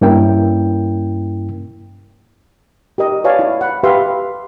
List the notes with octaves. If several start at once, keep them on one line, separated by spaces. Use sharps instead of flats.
G2 A#3 C#4 E4 A#4 G5
G4 A#4 D#5
B4 C#5 D5 F5 G#5 A5
E4
F#5 B5
G4 B4 E5 F5 C6